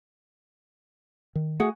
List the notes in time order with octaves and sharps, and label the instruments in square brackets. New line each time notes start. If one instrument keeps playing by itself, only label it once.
[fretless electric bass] D#3
[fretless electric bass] A3 [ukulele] F#4 G#4 F#5